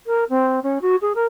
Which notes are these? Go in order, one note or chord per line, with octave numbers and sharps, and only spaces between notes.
A#4
C4
C#4
F#4
G#4
A#4